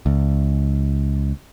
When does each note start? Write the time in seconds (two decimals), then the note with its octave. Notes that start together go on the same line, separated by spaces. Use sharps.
0.06 C#2